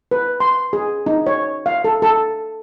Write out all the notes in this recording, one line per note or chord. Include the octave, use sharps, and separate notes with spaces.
B4
C6
G#4
D#4
C#5
F5
A4
A4